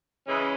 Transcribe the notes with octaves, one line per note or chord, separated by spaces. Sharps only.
C#3 E3 G#3 C#4